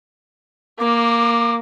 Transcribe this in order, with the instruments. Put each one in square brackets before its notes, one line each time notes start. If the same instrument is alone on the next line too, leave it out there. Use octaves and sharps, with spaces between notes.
[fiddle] A#3 [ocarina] D6